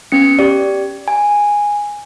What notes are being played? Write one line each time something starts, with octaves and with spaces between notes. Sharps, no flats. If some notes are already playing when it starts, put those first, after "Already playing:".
B3 C#4 C#7
G4 D5
G#5